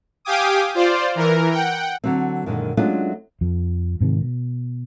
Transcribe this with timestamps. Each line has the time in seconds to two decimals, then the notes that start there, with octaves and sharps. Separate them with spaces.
0.25 G4 F5 G5 G#5 D6 D#6
0.75 F4 C5 D5
1.15 E3 A#4
1.51 F#5 G5
2.04 D3 F#3 C4
2.46 F#2 A#2 D3 D#3 G#3
2.77 F#3 G#3 A3 C#4 D4 F4
3.41 F2 F3
4.01 G#2 C3 D#3
4.21 B2